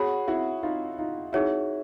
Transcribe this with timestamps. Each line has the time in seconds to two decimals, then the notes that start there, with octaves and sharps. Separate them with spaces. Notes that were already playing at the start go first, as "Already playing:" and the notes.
Already playing: F#4 G#4 C#5 F#5 B5
0.28 E4 F#4
0.63 D#4 F4
0.98 D#4 F4
1.33 D#4 E4 F#4 G#4 C#5 E5